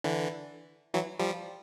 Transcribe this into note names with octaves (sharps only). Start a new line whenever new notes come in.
D3 E3
E3 F#3
F3 G3